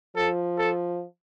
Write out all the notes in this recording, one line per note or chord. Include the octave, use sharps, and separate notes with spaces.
F3 A4
A4